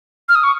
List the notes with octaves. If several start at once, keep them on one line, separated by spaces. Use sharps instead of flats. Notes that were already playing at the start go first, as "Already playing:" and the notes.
F6
D#6
C#6